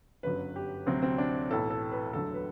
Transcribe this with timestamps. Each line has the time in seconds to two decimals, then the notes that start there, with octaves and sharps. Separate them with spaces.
0.23 G1 F#2 D3 F#3 B4
0.56 G4
0.86 D2 C3 F#3 C4
1.02 C4
1.18 D4
1.50 B1 A2 E3 A4
1.71 A4
1.92 B4
2.13 E1 D2 D3 F#3 A4
2.34 B4